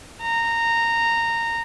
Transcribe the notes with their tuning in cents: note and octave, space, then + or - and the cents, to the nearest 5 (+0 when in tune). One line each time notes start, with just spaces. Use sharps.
A#5 -15